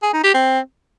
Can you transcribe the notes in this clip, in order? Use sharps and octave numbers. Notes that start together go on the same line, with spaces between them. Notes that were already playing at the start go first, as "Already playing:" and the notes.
G#4
D#4
G4
C4